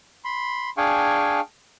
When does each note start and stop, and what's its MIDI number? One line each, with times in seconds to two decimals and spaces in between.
0.25 0.70 83
0.25 0.70 84
0.77 1.40 62
0.77 1.40 68
0.77 1.40 77
0.77 1.40 79
0.77 1.40 80
0.77 1.40 85